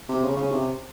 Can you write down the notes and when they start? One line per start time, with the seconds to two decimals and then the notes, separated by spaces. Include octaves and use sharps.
0.09 C3
0.24 C#3
0.37 C#3
0.51 C3